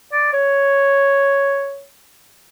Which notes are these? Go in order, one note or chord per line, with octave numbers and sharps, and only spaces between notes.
D5
C#5